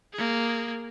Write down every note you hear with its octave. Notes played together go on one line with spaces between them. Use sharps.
A#3 G#4